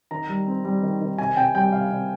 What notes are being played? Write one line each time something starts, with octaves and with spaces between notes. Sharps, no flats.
D#3 A#5
G3
C4
G3
D#3
D#3
C3 G#5
C3 G5
G3 G5
C3 F5
C3